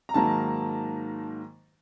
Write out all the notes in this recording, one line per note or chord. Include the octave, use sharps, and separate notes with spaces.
A#5
G#2 D#3 F#3 A#3 A5